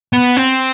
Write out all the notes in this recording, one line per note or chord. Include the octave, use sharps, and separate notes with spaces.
B3
C4